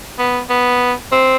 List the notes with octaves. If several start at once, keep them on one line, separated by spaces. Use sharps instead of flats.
B3
B3
C4